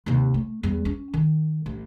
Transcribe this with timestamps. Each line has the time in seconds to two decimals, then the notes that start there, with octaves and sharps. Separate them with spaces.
0.06 D#2 C3
0.34 A3
0.63 E2 G3
0.85 C#4
1.14 D#3
1.66 A1